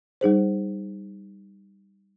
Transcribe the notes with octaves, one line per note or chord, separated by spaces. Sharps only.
G3 D#4 G#4 C5